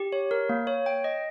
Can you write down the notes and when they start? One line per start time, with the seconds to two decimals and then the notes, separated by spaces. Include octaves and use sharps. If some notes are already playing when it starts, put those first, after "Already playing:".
Already playing: G4
0.12 C#5
0.31 A#4
0.49 A#3
0.67 C#5
0.86 G5
1.04 D#5